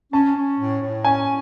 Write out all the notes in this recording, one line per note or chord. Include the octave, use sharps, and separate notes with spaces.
C#4 A5
C#4
A2
A2
C#4 G#5